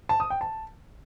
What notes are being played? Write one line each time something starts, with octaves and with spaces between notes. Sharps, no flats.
A5
D#6
G5
A5